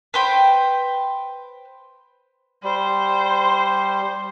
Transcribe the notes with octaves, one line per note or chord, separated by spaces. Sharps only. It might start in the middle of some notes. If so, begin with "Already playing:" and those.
B4 C5 G5
G3 C5